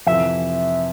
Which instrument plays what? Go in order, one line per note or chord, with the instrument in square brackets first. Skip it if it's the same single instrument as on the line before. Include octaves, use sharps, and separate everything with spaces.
[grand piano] F2 C3 E3 [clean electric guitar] E5